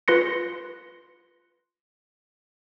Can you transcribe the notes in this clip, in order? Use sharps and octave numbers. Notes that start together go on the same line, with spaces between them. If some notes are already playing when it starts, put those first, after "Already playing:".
F4 B4 C6 A#6 C#7